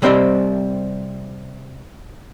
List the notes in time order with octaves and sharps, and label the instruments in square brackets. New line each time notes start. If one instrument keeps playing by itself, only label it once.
[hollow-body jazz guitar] C3 G3 C4 C5 D5 D#5